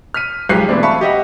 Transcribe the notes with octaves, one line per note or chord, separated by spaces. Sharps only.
F6 B6 D#7
B1 F3 G#3 G4 F#6 C7
B2 E3 A3 C4 D4
E5 F5 A5 B5 C#6 C#7
G4 D#5 E5 F#5